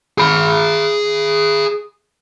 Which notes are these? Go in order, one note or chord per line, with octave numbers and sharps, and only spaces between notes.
G#4 B5